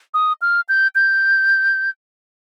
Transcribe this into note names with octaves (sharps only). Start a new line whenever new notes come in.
D#6
F6
G6
G6